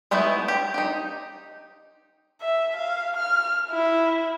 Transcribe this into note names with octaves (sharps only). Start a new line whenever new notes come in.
G#3 A3 B3 D#4 E4
G4
D#4 G4
E5
F5
F6
E4